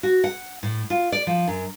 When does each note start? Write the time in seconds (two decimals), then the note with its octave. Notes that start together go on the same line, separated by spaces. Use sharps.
0.03 F#4
0.24 F#5
0.63 A2
0.90 F4
1.12 D5
1.27 F3
1.48 F#2